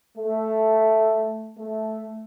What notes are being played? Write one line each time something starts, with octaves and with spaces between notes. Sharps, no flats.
A3
A3